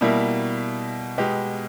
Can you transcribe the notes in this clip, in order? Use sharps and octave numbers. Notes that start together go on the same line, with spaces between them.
B2 G3 A#3 E4
B2 G#3 B3 G4